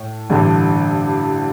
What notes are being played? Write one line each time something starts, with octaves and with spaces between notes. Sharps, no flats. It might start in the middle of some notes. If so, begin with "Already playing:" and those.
Already playing: A2
A1 G2 D3